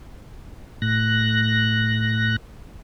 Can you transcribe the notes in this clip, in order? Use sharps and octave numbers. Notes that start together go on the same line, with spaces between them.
A2 F#6 A#6